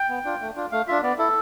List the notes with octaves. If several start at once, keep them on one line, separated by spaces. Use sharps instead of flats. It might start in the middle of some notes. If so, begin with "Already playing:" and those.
Already playing: G5
B3
D4 F4
A3
D4 F4
A3 F5
D4 F4 E5
B3 D5
E4 A4